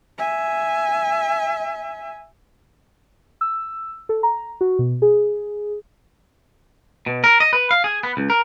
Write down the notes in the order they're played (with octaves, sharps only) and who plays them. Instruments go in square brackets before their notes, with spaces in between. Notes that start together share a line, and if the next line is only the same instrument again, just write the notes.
[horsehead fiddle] E5 G#5
[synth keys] E6
A4
A#5
F#4
B2
G#4
[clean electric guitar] B2
A#4
D#5
B4
F5
G#4
B3
C#2
A#4